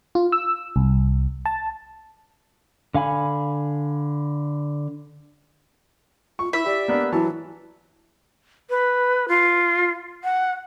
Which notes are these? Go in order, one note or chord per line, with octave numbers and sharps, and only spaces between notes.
F4
E6
C2
A5
D3 F5 G#5 B5
F4 C#6
E4 E5 B5
G4 D5
A#3 B3 D4
E3 F#3 E4 C#5 A5
B4
F4
F#5